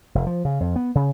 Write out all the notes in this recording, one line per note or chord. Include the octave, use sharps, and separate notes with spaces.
F1
F3
C#3
F2
B3
C#3